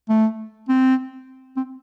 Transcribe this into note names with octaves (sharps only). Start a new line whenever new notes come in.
A3
C4
C4